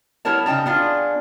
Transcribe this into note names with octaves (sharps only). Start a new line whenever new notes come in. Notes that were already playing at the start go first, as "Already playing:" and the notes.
G3 B3 E4 A#4 C#5 A5
C#3 D#4 G5 A5 A#5
B3 D4 F4 G#4